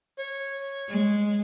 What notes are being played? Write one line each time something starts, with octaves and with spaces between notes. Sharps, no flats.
C#5
G#3